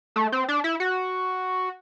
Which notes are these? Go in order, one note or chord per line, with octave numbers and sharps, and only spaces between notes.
A3
C4
D4
E4
F#4